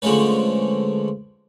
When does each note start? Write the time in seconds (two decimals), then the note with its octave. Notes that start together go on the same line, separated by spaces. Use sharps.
0.02 D3 F3 G#3 A3 C#4 B4